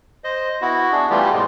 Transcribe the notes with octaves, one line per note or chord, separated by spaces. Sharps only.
C5 D#5
B3 E4 F#4
D4 G#4
E3 G3 A3 B3 F4 G4
A2 C3 G#3